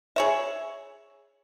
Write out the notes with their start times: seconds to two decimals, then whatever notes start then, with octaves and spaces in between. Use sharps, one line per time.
0.16 G#4 C#5 E5